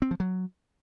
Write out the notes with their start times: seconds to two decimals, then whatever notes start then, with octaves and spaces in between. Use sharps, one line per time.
0.02 C4
0.11 F3
0.20 F#3